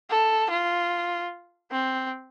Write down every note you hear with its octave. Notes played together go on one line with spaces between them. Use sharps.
A4
F4
C4